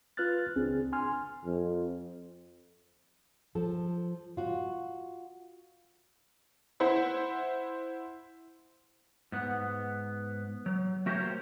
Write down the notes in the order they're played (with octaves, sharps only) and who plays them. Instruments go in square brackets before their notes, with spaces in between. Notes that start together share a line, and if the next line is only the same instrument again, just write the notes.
[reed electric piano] F4 B4 F6 F#6 A6
C#2 C4 D4 G#4
G#5 C6 F6
[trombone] F2
[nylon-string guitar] F3 A4
F4 F#4
[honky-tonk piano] E4 C5 F#5
[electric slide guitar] G#2 B3
F#3
A3 F#4 G4 A#4 C5 C#5